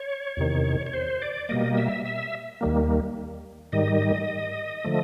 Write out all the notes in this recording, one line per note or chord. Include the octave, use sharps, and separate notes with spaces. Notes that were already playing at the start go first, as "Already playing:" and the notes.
Already playing: C#5
E2 C3 D#3
C#5
C5
D5
B2 G3 A#3 D#5
E5
E5
D#2 D#3 G3 A#3
G#2 D#3 G3 D#5
D3 F3 A3